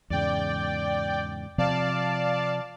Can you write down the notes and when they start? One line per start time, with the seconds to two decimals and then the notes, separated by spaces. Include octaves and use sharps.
0.10 E2 G#2 C#3 D5 G5
1.58 C3 F3 C4 D5 F5 A5